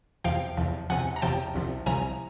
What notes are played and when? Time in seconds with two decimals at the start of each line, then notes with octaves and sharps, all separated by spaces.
0.24 E2 C3 F3 F5 G5
0.57 E2 C3 F3
0.90 E2 C3 F3 F#5 G#5
1.16 A#5
1.22 E2 C3 F3 G5 A5
1.54 C2 C3 F3
1.86 C2 C3 F3 G#5 A#5